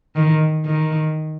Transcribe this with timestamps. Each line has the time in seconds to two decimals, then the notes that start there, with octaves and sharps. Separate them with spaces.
0.16 D#3
0.66 D#3